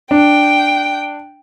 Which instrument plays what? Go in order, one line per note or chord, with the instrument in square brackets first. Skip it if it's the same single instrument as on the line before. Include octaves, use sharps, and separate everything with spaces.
[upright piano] D4 [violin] G5